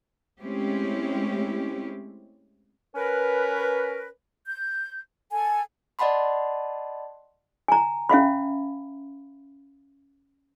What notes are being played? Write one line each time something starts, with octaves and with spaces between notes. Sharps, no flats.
G#3 A3 C4 C#4 E4 G4
C#4 A#4 B4
G6
A4 G#5
D5 D#5 F#5 A5 B5 C6
G#5 A#5
C#4 E5 F5 B5